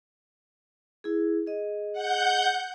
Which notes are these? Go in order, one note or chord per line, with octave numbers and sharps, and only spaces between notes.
E4 G#4
G#4 D#5
F#5 G6